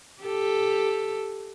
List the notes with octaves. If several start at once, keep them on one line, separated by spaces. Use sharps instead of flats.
G4 A4